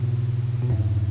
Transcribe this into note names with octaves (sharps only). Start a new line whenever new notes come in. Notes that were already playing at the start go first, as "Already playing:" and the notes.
Already playing: G#2 B2
B2
F#2 A2